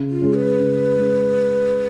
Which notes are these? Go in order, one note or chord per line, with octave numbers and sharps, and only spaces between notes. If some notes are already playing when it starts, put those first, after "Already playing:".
Already playing: C#3
F4
G#3 C#4
B4
C#3
G#3 C#4